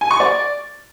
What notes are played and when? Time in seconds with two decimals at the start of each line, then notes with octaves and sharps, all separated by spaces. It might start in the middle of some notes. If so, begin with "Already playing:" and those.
0.01 G#5
0.11 C#6
0.20 D5